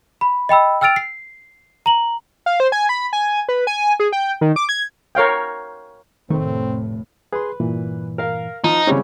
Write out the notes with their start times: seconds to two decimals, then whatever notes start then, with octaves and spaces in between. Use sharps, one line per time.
0.21 B5
0.49 D#5 G5 B5 E6
0.81 G5 E6 F6 A6 D7 F7
0.96 C7
1.86 A#5 F#7
2.46 F5
2.60 C5
2.72 G#5
2.89 B5
3.13 G#5
3.49 B4
3.67 G#5
4.00 G#4
4.12 G5
4.41 D#3
4.56 D6
4.69 G#6
5.15 A#4 C#5 F5 G5
6.30 F1 A2 D#3 A3 C4
7.33 G#4 B4 C6
7.60 G2 A#2 E3
8.18 A#4 F5
8.64 F3 D#4
8.87 C#3 G3 G#3 C4 C#4 E4